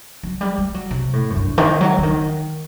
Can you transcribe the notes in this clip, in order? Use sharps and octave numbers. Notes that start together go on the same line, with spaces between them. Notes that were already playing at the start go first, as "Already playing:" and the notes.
F#3
G3
G3
F#3
C3
A2
F#2
G2
D#3
F#3
D3
D#3